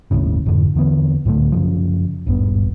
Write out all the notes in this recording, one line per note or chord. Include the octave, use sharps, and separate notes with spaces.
G1 D#2 A2 C#3
F1 F2 G#2 D3
E2 D3 E3 B3
C#2 A2 D3 A3
F#2 C#3 F3
D#1 G#1 G2 B3